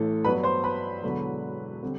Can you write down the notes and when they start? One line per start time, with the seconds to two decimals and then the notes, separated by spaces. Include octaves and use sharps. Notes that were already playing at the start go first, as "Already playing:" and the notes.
Already playing: A1 A2 E3 A3 A4
0.25 G2 F#3 B3 B4 B5
0.43 C5 C6
0.64 B4 B5
1.03 E1 E2 D3 F#3
1.83 D3 G3 C4